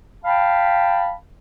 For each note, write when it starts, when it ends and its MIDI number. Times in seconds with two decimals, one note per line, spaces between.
0.25 1.12 77
0.25 1.12 79
0.25 1.12 81
0.25 1.12 83